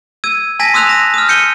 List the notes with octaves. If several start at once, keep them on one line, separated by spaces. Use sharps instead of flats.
E6 G#6 D#7
G#5 A5 G#6 A#6 B6 D#7
C6 D#6 E6 F#6 F7
D#6 A#6 E7
D#6 F6
F6 G6 C#7 D#7 G7